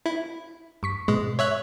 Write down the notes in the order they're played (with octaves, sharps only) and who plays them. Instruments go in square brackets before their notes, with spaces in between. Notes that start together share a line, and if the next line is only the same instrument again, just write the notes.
[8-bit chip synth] E4
[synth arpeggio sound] G2 C#6 B6
[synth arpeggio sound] G#2 B2 [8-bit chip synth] G#3
[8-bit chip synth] C#5 E5 F#6